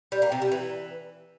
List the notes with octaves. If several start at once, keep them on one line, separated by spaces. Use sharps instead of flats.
G3
A#3
C3
G3
E3